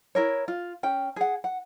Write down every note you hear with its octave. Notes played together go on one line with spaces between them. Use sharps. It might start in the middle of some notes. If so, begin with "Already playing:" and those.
E4 A#4 C#5
F4
C#4 G5
G#4 F#5
F#5